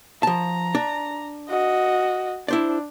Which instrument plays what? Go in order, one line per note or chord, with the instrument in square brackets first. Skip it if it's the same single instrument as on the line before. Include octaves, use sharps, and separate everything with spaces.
[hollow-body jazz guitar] F3 A5 [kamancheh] A#5
[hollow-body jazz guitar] D4
[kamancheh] F#4 D#5
[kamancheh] D4 [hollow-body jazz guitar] E4 C5 D5